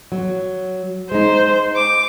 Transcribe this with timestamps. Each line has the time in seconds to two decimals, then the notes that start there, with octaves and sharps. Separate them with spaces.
0.12 F#3
1.12 G#3 D#4 C5
1.76 D6